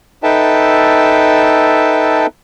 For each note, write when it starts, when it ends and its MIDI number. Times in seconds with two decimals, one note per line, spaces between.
0.23 2.26 63
0.23 2.26 69
0.23 2.26 71
0.23 2.26 76
0.23 2.26 79
0.23 2.26 81